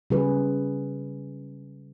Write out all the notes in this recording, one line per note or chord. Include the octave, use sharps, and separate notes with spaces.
C#3 G3 G#4 B4